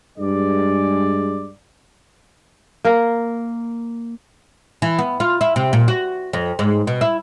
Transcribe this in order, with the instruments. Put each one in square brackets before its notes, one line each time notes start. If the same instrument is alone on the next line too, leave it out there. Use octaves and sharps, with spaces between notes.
[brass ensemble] G2 G#3 D5
[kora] A#3 A#4
[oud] E3
B3
F4
E4
C3
A#2
F#4
F2
G#2
B2
E4